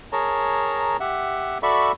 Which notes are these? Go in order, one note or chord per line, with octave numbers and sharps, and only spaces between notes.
G#4 A#4 C#5 A5 A#5
G4 E5 F#5
F#4 A4 D5 E5 B5 C#6